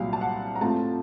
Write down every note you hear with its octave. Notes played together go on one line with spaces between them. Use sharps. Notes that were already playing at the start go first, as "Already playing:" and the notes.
Already playing: C2 A#2 F#3 F5
A5
F#5
A#5
A2 A3 C4 F4 A5